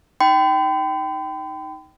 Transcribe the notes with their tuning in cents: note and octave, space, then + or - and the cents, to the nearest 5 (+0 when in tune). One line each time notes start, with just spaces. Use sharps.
D#4 +0 G5 -15 B5 +45